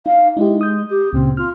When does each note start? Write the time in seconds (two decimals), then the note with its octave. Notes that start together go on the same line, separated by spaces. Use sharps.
0.06 D#4 F5
0.37 G#3 D#4 E4 G4
0.61 D#6 G6
0.90 G4
1.13 C#2 A#2 C#3 C4
1.37 F4 F6